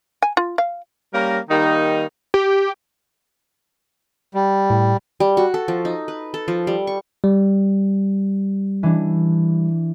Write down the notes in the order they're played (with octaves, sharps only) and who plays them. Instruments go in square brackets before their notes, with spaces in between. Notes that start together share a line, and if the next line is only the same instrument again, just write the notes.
[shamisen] G#5
F4
F5
[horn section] G3 A#3 C#4 A#4
D#3 G3 A#3 D#4
[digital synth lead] G4
[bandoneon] G3
[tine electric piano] A2
[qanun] G3
F#4
A4
F3
D#4
B4
A4
F3
G3
C#6
[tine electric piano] G3
[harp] E3 D4